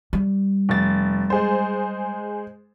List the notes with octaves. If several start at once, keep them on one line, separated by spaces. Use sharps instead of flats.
G3
F1 A6
G#3 G#4 C5